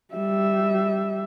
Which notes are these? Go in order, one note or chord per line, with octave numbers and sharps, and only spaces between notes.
G3 E5